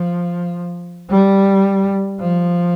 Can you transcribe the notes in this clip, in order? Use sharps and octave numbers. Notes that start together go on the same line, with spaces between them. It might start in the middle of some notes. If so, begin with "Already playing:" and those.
Already playing: F3
G3
F3